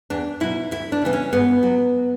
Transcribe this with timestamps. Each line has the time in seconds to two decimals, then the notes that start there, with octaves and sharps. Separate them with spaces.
0.10 E2 D4
0.40 B2 F#3 E4
0.71 D2 E4
0.92 D4
1.02 C#3 E3 B3
1.13 C#4
1.33 G#2 B3
1.63 F#3